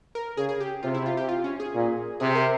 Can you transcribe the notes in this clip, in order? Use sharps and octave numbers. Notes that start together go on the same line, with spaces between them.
A#4
C#3 G#4
G#4
G4
C3 F4
E4
F4
G4
F4
C#4
G#4
A#2
C3 G#4
A#4